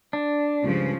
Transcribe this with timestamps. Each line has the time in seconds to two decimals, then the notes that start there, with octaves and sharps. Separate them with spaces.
0.13 D4
0.64 C#2 G2 C#3 F3